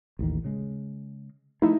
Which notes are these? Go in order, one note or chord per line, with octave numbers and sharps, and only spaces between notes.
A1 D#2 D#3
C#3 G#3
F3 A3 D#4 E4